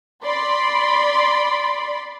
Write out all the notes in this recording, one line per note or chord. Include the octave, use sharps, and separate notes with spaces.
D5 B5 C6